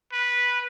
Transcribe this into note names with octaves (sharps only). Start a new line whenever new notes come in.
B4